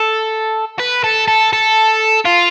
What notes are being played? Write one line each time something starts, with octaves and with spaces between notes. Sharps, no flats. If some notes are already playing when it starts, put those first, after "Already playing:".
Already playing: A4
B4
A4
A4
A4
F4